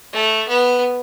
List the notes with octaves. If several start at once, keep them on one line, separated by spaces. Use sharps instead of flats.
A3
B3